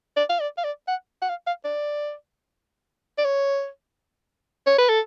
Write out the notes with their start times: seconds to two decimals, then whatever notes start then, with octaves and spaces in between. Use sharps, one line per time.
0.16 D5
0.29 F5
0.40 D5
0.57 F5
0.64 D5
0.88 F#5
1.22 F#5
1.29 F5
1.47 F5
1.65 D5
3.18 D5
3.24 C#5
4.66 C#5
4.78 B4
4.89 A4